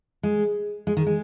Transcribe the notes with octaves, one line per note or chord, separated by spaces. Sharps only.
G#3
G#3
D#3
G#3